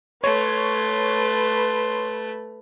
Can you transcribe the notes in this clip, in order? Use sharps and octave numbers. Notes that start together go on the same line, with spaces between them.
A3 B4 C#5 C6